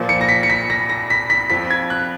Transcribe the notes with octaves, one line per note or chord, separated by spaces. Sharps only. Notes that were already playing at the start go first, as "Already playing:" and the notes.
Already playing: A#2 F3
C#7
A#6
B6
C#7
B6
A#6
A#6
B6
B6
F2 F3 B6
G#6
F#6